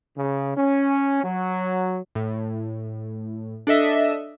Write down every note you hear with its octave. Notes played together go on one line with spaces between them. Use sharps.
C#3
C#4
F#3
A2
D4 A4 D#5 E5